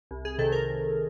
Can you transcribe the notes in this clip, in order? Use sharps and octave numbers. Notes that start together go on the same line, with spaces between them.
C2
G#4
C3 D#3 A4
A#4